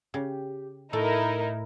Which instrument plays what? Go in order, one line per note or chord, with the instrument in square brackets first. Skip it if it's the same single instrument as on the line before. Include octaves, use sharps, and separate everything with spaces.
[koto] C#3 [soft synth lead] G4
[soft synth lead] A2 [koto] A3 [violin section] D#4 E4 A#4